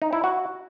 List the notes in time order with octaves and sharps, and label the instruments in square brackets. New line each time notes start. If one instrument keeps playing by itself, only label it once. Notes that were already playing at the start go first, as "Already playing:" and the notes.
[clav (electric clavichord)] D#4
E4
F#4